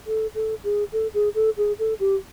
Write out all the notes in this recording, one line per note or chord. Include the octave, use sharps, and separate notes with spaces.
A4
A4
G#4
A4
G#4
A4
G#4
A4
G4